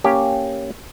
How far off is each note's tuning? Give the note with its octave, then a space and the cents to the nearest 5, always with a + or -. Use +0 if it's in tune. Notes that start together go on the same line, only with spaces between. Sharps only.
A#3 -10 C#4 +5 G4 +0